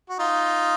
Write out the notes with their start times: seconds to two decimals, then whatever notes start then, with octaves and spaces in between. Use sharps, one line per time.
0.09 F#4
0.19 D#4 F4